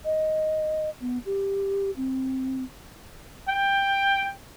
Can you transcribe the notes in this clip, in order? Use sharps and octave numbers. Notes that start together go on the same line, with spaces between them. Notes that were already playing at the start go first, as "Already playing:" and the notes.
D#5
B3
G4
C4
G5